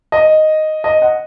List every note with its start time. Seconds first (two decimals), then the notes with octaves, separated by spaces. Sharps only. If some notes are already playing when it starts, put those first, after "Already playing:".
0.12 D#5
0.84 D#5
1.02 F#5